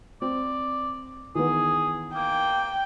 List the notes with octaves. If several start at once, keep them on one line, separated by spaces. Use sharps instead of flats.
C4 D5
D#3 E3 B3 G#4
A#3 G5